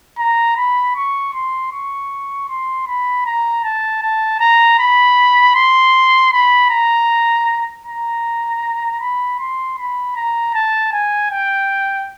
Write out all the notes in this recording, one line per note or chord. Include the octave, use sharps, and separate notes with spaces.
A#5
B5
C#6
C6
C#6
C6
B5
A#5
A5
A5
A#5
B5
C6
B5
A#5
A#5
B5
C6
B5
A#5
A5
G#5
G5